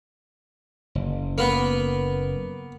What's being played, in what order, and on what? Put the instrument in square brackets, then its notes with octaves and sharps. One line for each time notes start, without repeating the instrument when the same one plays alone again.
[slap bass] F#1
[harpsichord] A#3 B3